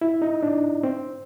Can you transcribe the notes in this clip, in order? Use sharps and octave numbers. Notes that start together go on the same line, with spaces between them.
E4
D#4
D4
C4